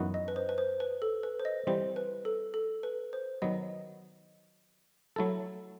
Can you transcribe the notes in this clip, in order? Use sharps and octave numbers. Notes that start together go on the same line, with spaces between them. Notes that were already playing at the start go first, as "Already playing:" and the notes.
Already playing: F#2 E3 B3 D#4 F#4
D#5
B4
C5
B4
C5
B4
A4
B4
C5
D#5
E3 G3 C4 C5
B4
A4
A4
B4
C5
D#3 F#3 B3 D#5
F#3 A3 E4 A4